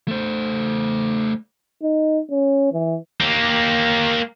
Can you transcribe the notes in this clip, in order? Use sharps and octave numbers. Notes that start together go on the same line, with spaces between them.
A3 C5
D#4
C#4
E3
A#3 G4